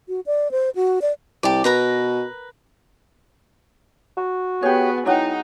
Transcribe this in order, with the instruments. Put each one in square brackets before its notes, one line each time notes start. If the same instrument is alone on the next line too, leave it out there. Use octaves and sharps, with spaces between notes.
[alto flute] F#4
D5
C5
F#4
D5
[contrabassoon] C2 [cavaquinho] G4 D5
[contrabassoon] B2 [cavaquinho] A#4 B4 A#5
[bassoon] F#4
[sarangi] B3 [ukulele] G4 C#5 [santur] G#4
[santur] F#3 D#5 F#5 [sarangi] D#4 [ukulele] E4 G5